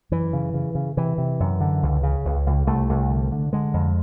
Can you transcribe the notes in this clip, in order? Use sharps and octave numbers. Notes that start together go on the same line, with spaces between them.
F#2 E3
C#3
C#3
C#3
C3 E3
C3
F#2
D3
C#2
C#3
C#2
C#2
C2 A3
C2
D3
D3
D3 G#3
F2